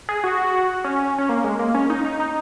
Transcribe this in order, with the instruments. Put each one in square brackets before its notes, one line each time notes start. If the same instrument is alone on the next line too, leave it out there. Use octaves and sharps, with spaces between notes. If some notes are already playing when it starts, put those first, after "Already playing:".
[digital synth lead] G#4
F#4
C#4
C#4
A#3
G#3
A#3
C#4
D#4
D#4
D#4